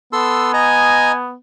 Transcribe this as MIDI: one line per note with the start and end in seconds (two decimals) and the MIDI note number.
0.13 1.35 59
0.13 0.52 69
0.13 0.52 84
0.13 0.52 88
0.54 1.12 75
0.54 1.16 80
0.54 1.12 82